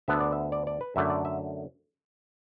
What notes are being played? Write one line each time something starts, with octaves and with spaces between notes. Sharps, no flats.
D2 D3 B3 D4 E5
D5
E5
D5
D5
B4
F#2 D3 A3 E5
D5
E5